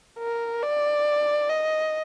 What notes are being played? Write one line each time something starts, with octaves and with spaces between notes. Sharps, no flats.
A#4
D5
D#5